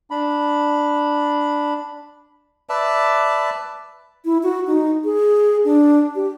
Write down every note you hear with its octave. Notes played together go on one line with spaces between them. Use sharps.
D4 B5
B4 D5 E5 A5
E4
F#4
D#4
G#4
D4
G4